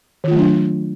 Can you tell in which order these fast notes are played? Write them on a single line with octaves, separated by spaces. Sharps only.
D#3 F4 A3 F#3 D4